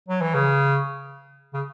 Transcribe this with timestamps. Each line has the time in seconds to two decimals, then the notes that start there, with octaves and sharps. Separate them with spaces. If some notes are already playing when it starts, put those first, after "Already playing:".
0.08 F#3
0.21 E3
0.34 C#3
1.53 C#3